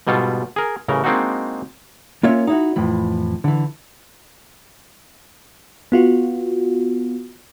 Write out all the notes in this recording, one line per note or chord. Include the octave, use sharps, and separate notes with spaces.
G#2 B2 G3 F4 A4
G#4 A#4
A1 C#3 E3 A#4
G#3 A#3 C4 D4 D#4 F#4
A#3 C#4 F4 A#4 C#5 E5
D#4 E4 F#4
F2 A2 E3
D3 E3
B3 F4 F#4